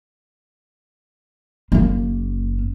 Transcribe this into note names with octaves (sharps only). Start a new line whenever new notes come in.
F#1 A#3